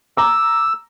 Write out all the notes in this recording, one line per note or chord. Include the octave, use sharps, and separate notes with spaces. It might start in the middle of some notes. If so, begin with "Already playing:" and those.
A#5 D6 E6